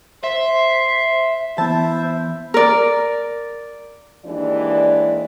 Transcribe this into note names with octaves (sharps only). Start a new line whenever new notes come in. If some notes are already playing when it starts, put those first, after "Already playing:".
C5 E5 C6
E3 B3 E4 C5 E5 A5
A#4 D5
D#2 E3 G#3 D4 D5